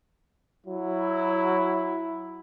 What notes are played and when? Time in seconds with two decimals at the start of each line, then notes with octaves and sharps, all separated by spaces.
0.66 F#3 E4